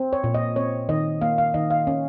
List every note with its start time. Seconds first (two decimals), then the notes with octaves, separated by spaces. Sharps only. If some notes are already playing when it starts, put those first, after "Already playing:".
Already playing: C4
0.13 C#5
0.24 A#2
0.34 D#5
0.56 C4 C#5
0.89 D#3 D#5
1.21 A#3 F5
1.38 F5
1.54 D#3 D#5
1.70 F5
1.87 C#4